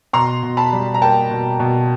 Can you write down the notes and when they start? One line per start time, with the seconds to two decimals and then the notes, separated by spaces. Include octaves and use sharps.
0.13 B2 A#5 C6
0.43 B2
0.57 A5 B5
0.73 G3
0.94 A#5
1.01 A#3 G5 A5
1.31 B2
1.60 B2